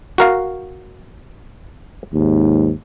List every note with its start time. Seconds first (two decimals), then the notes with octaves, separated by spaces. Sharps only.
0.18 F#4 A#4 F5
2.13 D#2 G#2